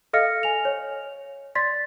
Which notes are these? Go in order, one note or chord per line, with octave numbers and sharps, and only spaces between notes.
A4 D#5 F5 F6 A#6 C#7
G#5 F7
C#5
D5 C6 A6 B6